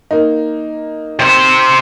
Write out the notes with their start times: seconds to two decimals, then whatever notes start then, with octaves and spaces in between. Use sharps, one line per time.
0.11 A#3 D#4
1.19 C3 C5